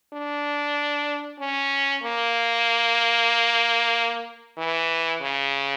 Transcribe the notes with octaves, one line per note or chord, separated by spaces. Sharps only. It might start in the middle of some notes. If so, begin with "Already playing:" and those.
D4
C#4
A#3
E3
C#3